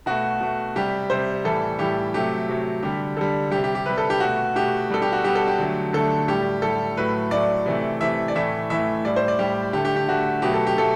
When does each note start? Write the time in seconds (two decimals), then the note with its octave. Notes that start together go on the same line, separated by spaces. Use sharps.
0.06 B2 A3 F#4
0.40 B2 A3
0.76 C3 G3 G4
1.10 C3 G3 C5
1.44 A2 E3 G3 A4
1.79 A2 E3 G3 G4
2.14 C3 F#3 A3 G4
2.48 C3 F#3 A3
2.82 D3 G3 G4
3.17 D3 G3 A4
3.51 G3 G4
3.55 C3
3.64 G4
3.75 G4
3.86 C3 G3 B4
3.98 A4
4.10 G4
4.20 B2 A3 F#4
4.55 B2 A3 G4
4.90 B2 G3 A4
5.02 G4
5.12 F#4
5.24 B2 G3 G4
5.35 A4
5.47 G4
5.58 D3 F#3 A3
5.93 D3 F#3 A3 A4
6.28 A2 G3 G4
6.62 A2 G3 A4
6.97 A2 F#3 A3 B4
7.31 A2 F#3 A3 D5
7.66 C3 E3 A3
8.01 C3 E3 A3 E5
8.28 D5
8.35 A2 E3 A3 E5
8.70 A2 E3 A3 E5
9.05 A2 G3 D5
9.16 C5
9.28 D5
9.39 A2 G3 G4
9.73 D3 A3 G4
9.85 G4
9.96 G4
10.08 D3 A3 F#4
10.42 B2 F#3 A3 G4
10.54 A4
10.67 G4
10.77 B2 F#3 A3 A4